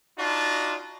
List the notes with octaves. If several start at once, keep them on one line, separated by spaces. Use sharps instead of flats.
D4 D#4 F4 F#4